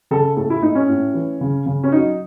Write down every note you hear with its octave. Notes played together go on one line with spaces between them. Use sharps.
C#3 A4
A2 A4
E4
A2 D#4
C#4
A2
E3
C#3
C#3
C#4
F#3 D#4